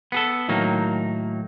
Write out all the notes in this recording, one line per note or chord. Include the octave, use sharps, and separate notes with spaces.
B3 G#4 A4
A2 D#3 F#3 A#3 D#4